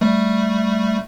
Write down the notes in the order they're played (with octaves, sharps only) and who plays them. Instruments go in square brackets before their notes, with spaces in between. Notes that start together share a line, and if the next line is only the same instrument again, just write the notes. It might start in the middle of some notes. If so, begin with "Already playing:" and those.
[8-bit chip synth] G3 A3